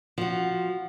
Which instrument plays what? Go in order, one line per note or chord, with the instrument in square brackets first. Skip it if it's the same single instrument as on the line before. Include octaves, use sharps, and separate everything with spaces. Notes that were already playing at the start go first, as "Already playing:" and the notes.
[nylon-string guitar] F3 F#4